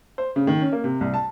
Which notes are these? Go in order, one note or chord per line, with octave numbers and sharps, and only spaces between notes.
C5
C#3
D#3
C#4
A#3
C3
C2
A5